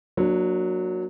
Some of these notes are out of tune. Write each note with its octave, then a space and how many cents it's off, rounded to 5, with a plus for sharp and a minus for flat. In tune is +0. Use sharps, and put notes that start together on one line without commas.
F#3 -15 A#3 +10 D4 +20